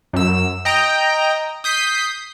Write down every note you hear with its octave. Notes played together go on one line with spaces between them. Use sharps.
F#2 E6
D#5 G5 A#5
D#6 G6 B6 C7